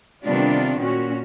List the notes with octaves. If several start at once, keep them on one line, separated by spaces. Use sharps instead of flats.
C3 D#3 G3 B3 D4 F4
A#2 C#4 F#4